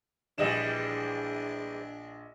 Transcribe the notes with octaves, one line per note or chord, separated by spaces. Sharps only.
A#1 E3 G3 G#3 D4 D#5 E7